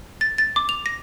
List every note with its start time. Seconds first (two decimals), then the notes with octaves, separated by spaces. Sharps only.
0.21 A6
0.38 A6
0.56 D6
0.69 F7
0.86 A#6